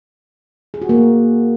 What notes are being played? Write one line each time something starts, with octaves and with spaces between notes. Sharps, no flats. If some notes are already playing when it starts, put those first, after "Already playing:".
G#4
F#4
A#3